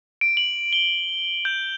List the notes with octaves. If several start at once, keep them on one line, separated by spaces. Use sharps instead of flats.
D7
F#7
G7
G6